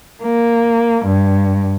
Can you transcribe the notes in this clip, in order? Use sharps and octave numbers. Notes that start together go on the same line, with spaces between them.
A#3
G2